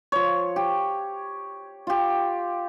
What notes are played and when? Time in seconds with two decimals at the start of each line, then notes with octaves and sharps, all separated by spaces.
0.12 F3 C#5
0.56 G4
1.87 F4 G4